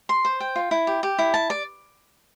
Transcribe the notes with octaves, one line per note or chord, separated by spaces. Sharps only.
C6
C5
G5
F4
E4
G4
G4
E4
A5
D5